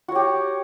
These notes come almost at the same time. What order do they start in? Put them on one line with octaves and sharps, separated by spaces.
F#4 C#5 G4